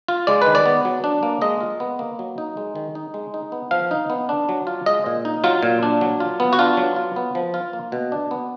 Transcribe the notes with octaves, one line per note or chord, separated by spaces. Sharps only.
F4
G#3 D5
D#3 B4
D5
B3
F#3
D4
A#3
G#3 D#5
F4
B3
A#3
F#3
D#4
G#3
D#3
D#4
G#3
D#4
B3
F3 F5
D#4
B3
D4
F#3
F4
G#3 D#5
A#2
D#4
F#3 F4
A#2
D4
F#3
F4
B3
F#4
D4 F4
F#3
F4
B3
F3
F4
A#3
B2
D4
B3